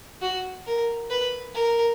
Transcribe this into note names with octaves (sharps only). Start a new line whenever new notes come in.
F#4
A#4
B4
A#4